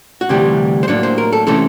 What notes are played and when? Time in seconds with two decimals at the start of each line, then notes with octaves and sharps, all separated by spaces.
0.21 F#4
0.29 D2 C3 E3 G3 G4
0.83 C5
0.88 A2 F#3 A#3 D4 C#5
1.03 C5
1.18 A#4
1.33 A4
1.47 C3 E3 A3 C#4 A4